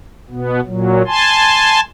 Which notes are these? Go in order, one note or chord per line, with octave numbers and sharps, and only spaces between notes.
B2 B3
A#2 F#3
G#5 A5 C6